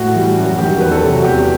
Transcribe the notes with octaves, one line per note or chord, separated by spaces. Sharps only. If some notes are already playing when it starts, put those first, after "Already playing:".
Already playing: A2 F#4
E3 G3
F#2 F#4
D#3 G3 G4
E2 B4
A4
C3 F#3
F#4
E2 G4